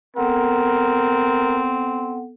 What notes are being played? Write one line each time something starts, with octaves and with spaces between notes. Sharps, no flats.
B3 C4 A4 A#4 F#5